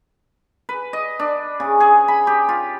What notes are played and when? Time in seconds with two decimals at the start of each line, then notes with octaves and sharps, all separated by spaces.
0.69 B4
0.93 D#5
1.20 D4
1.60 C#3
1.80 G#4
2.08 B5
2.27 G4
2.49 F4